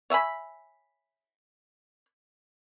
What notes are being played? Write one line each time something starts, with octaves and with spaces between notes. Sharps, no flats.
C#5 E5 G#5 B5